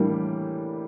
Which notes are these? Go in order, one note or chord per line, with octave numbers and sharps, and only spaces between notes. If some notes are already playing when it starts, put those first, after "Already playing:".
Already playing: A2 E3 G3 A#3 D4